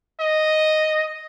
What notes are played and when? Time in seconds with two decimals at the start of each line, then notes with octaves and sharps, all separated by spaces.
0.20 D#5